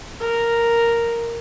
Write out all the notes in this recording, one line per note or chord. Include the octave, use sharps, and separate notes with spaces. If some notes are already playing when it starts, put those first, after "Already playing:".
A#4